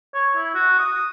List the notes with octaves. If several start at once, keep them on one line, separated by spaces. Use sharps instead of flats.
C#5
E4
F#4
D#6